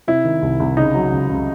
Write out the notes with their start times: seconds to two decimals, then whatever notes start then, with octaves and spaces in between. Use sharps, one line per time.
0.08 C3 E4
0.25 D#3
0.42 C2
0.60 C2
0.77 C#3 D#4
0.95 F#3
1.12 C#2
1.30 C#2